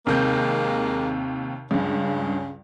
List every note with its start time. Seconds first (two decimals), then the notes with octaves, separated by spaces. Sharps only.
0.07 D#2 C3 G#3 A#3 G6
1.71 C#2 G2 C#3